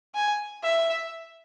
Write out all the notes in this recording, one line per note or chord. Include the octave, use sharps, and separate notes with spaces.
G#5
E5